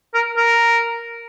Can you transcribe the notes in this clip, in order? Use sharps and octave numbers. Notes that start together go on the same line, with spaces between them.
A#4
A#4